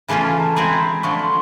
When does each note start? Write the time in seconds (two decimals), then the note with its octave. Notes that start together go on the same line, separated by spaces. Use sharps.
0.08 C#3 E3 A3 C#4 F4 G#5
0.25 A5
0.40 A#5
0.55 G#3 C4 E4 G#4 B5
1.03 D3 F3 A3 C#6
1.19 C6